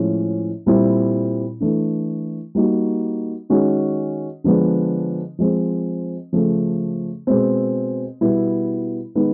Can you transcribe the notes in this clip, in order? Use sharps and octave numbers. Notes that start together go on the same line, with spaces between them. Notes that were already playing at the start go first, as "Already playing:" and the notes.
Already playing: A2 F3 G#3 C#4 E4
A#2 G3 C4 E4
E3 A3 D4
G3 A#3 D#4 F#4
D#3 G#3 C#4 F#4
D3 F3 G#3 B3 D4
F3 G#3 C4
C#3 F3 A3
B2 G#3 C4
B2 G3 B3 E4
D#3 G#3 B3 D#4